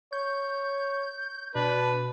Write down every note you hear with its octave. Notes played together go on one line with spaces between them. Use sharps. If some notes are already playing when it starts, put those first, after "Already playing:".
C#5 G6
B2 D4 B4